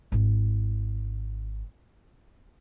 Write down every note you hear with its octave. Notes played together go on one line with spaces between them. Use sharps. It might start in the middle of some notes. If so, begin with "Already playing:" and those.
G#1 E4